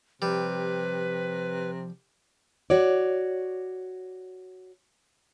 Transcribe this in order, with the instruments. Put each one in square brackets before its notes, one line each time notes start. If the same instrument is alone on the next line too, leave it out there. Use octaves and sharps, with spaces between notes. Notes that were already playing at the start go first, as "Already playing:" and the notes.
[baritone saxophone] C3 [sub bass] F3 [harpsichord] G3 [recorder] B4
[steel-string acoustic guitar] F#4 C#5 D5